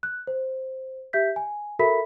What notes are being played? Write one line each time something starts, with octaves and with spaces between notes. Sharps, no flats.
F#6
C5
G4 E5 G6 B6
G#5
F#4 A4 A#4 E5 B5 B6